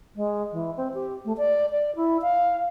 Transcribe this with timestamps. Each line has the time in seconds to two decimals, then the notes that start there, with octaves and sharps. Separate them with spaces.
0.15 G#3
0.52 E3
0.77 C4
0.94 G4
1.25 A3
1.38 D5
1.70 D5
1.96 E4
2.22 F5